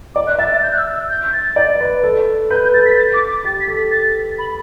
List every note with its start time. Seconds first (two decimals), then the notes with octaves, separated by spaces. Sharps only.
0.15 D5 D6
0.27 F#6
0.38 E5 A6
0.51 A6
0.63 G6
0.72 F#6
0.78 E6
0.94 E6
1.10 G6
1.33 A6
1.56 D5
1.81 B4
2.03 A4
2.51 B4 G6
2.63 G6
2.74 A4 A6
2.86 B6
2.97 A6
3.14 D6
3.29 D6
3.44 G4 A6
3.61 B6
3.68 A4
3.76 B6
3.91 A6
4.38 B5